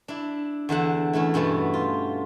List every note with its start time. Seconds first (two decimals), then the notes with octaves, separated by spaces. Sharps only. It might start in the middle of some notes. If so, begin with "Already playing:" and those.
0.08 D4 E4
0.69 E2 D3 E5 F#5
1.13 E3 A3 C#4 E4
1.34 G2 B2 A3 B3
1.74 F4